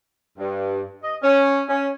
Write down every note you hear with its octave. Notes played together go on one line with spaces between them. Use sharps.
G2
D#5
C#4
C#4